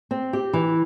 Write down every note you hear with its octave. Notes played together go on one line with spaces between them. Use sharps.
C4
G4
E3